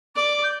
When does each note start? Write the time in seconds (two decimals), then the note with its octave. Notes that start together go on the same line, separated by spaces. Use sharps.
0.15 D5 D6
0.43 G6